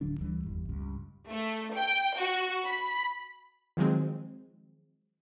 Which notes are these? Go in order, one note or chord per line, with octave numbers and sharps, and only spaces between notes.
D1 D3 F#3 D4
D2 E3 G3
G1 E2 G2
C#2 G2
A3
G5
F#4
B5
D#3 F3 F#3 G#3 C4